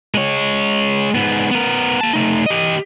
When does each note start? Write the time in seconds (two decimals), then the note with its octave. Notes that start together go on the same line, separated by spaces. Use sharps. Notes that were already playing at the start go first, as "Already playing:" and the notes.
0.15 G#3 C#5
1.15 G#2 B3
1.51 B3 A#4
2.01 A#3 A5
2.13 A3 D#4
2.46 G4 D#5